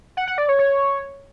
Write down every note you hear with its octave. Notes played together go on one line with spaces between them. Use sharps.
F#5
F#5
D5
C#5
C#5